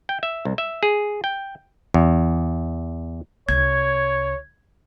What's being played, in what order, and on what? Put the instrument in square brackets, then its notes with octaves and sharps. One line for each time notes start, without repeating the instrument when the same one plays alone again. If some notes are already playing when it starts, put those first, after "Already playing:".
[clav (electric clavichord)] G5
E5
C2
E5
G#4
G5
E2
[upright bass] C2 [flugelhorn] C#5 [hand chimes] G#6